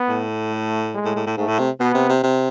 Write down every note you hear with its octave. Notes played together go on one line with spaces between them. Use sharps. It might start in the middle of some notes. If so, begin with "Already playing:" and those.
Already playing: B3
A2
A3
G#3
A2
A2
A2
G#2 A3
A2
C3
B2 B3
C3
C3
C3